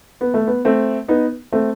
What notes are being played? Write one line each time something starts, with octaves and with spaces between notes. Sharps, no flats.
B3
A3
B3
A3 C4
B3 D#4
A3 C4